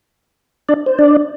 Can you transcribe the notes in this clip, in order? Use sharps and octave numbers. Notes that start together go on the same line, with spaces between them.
D4 D5
C5
D4 D5